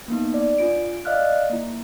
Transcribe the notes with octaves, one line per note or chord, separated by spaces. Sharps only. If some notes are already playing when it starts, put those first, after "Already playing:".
A#3 B3 D#4
D5
D4 F4 D7
D5 D#5 F5 F6 F#6
A#3 E4